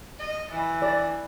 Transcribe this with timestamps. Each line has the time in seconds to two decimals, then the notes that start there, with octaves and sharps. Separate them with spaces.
0.19 D#5
0.51 E3
0.82 D5